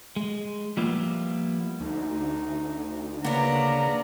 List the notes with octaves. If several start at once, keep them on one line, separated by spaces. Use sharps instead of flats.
G#3
F3 G3 A#3 B3 E4 F4
D2 D#4
C#3 A#3 B3 D4 A#5